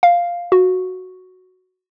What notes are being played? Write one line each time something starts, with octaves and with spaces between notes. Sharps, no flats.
F5
F#4